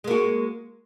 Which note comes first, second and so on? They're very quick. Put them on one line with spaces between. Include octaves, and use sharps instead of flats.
G#3 A#3 F#4